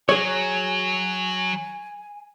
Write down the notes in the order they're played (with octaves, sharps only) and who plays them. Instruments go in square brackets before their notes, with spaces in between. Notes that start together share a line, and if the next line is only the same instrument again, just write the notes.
[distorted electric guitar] F#3 [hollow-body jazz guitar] G#4 C#5 [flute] G#5